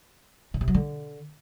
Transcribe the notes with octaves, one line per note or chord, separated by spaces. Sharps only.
C#3
C3
F#3
D3